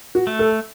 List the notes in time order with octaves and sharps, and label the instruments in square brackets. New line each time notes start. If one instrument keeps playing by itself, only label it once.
[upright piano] F#4
[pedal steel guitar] A3
[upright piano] A4